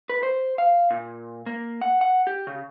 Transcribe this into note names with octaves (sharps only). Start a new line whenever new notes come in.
B4
C5
F5
A#2
A#3
F#5
F#5
G4
C#3